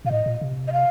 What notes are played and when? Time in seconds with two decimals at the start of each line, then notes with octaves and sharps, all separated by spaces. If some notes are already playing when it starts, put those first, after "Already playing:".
0.05 A#2 F5
0.11 A2 D#5
0.26 A#2
0.41 C3
0.68 D#5
0.72 F5